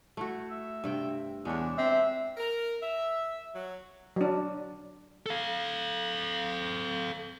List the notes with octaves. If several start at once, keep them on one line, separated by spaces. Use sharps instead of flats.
A3 E4 F#4
E5
G2 C3 G5
E2 G#3 D4 C#5
C4 E5
A#4
E5
F#3
F#3 D4
A4 F5